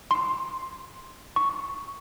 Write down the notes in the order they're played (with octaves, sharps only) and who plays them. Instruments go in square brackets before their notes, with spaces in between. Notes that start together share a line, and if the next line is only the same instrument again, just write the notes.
[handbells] C6
C#6